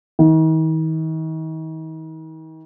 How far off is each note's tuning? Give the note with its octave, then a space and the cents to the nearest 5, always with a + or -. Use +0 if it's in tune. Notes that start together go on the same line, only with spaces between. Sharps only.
D#3 +40